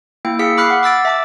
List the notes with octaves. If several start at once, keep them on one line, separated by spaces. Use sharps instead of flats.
A#3 E4 G5
G#4 F5 E6 B6 C#7
B5 D6 F6 F#6 B6 C7
F#5
D6 E6 A6 D7
E5 A5 D6